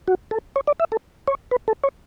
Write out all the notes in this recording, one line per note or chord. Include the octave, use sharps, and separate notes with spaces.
F#4
A4
C#5
D5
E5
A4
C#5
B4
A4
C#5